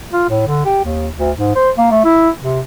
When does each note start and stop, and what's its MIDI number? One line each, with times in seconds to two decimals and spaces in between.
0.13 0.27 65
0.29 0.43 45
0.46 0.63 50
0.65 0.80 67
0.84 1.09 39
1.18 1.31 38
1.37 1.54 44
1.55 1.70 72
1.77 1.89 58
1.91 2.01 57
2.04 2.29 64
2.42 2.60 48